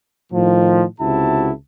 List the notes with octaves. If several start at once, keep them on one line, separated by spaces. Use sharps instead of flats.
A2 D#3 F3
C#2 C3 E4 F#4 A5